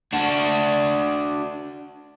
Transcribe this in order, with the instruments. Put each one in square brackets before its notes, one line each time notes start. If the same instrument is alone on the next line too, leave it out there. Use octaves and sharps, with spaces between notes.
[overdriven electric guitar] D4 F#4